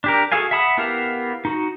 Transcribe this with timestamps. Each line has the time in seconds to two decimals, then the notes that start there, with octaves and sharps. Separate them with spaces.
0.04 D4 G4 A#4
0.32 F#4 G#4 A4 F5 G#5
0.51 E5 F#5 A5 B5 D#6
0.77 B3 E4 G4 A#4 F5
1.45 D#4 F#4